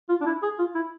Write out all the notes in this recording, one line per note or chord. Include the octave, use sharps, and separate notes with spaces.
F4
D4
E4
G#4
F4
E4